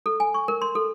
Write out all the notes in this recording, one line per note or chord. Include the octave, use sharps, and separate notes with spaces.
A4
G#5
C#6
A#4
C6
A4